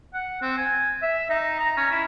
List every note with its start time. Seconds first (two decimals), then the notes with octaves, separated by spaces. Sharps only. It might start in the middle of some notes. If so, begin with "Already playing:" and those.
0.14 F#5
0.42 C4
0.57 G#5
1.02 E5
1.30 D#4
1.60 A#5
1.77 C#4
1.91 E4